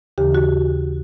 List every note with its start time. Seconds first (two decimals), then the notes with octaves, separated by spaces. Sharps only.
0.18 D#2 C#3 E3 G4
0.34 F#4